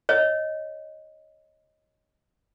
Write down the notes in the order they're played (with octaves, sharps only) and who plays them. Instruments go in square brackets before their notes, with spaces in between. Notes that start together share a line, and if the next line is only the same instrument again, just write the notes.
[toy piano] C#5 D#5